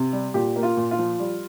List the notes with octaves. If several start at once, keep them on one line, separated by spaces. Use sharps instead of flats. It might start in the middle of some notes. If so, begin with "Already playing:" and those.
Already playing: C3
G3
A#2 G4
A#3
F4
A#2
F4
F3
G3